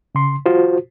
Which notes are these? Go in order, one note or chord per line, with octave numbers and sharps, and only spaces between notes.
C#3 C6
F4 F#4 C5